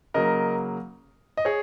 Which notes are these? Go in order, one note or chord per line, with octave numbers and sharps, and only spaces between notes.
C#3 F#3 A#3 A#4 D#5
D#5
G#4 C#5